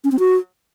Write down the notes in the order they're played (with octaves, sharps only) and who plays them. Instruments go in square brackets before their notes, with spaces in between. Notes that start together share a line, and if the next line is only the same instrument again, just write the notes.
[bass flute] C#4
C4
F#4